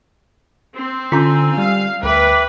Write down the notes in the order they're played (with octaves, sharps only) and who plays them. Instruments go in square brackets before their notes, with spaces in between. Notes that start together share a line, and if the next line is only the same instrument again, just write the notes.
[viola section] C4
[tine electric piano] D3 A#5 G6 [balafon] C#4 F4 [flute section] G#5 E6
[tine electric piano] G3 [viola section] F5
[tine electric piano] D2 [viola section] B4 [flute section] E5 G5 D6